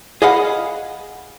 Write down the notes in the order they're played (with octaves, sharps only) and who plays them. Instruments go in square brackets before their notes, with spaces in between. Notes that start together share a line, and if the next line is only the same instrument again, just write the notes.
[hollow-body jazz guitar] G#4 D#5 F5 F#5 B5